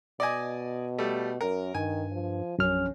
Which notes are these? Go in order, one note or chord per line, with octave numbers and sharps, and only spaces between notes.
B2 D5 D#5 G#5
G3 A3
F#2 A#4
G2 D#3 G#5
F3
A#1 F#2 C#4 F6